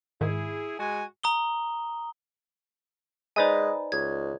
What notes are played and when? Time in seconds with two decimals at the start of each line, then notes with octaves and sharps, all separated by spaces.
0.21 G#2 D#3 E4 G#4
0.79 G#3 F#4 G#5
1.23 A#5 D#6 G7
3.36 G#3 D#4 B4 C5 D5 D#5 G#5
3.92 C#2 G#6